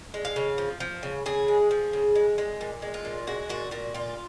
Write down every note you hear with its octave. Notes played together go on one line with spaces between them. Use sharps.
G#3
F5
C#3
F3
F3
C#3
C#3 G#4
G#3
F3
C#3
G#3
G#3
A#2
G#3
F4
A#2
G#3 F#4
A#2 F#4
A#2 F#4
A#2 F4